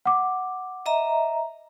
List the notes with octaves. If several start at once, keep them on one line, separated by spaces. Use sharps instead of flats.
F#5 D6
D#5 E5 A#5